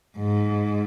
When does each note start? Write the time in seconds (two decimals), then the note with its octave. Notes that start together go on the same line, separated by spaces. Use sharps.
0.17 G#2